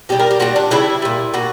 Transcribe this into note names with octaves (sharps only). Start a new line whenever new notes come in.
B2 G3 G4
A#4
G4
A#2 G3 F#4
D4
C#3 E3 G3 E4
A#2 G3
A#2 F#4